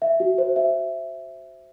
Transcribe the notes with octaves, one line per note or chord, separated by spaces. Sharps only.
E5
F#4
C5
E5